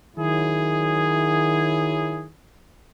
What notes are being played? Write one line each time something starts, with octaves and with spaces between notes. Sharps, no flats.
D#3 F#3 E4 G#4